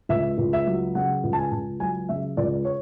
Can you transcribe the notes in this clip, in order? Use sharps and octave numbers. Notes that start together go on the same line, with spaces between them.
C#2 E5
C#2
E5
F#3
C#3 F#5
C#2
A5
G#5
C#2
F#3 G#5
C#3 E5
C#2 D5
C#5